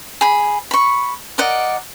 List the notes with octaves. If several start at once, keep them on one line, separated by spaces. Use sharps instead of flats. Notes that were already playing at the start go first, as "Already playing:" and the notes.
G#4 B5
B5 C#6
A#4 D5 D#5 F#5